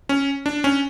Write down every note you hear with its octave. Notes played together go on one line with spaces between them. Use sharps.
C#4
D4
C#4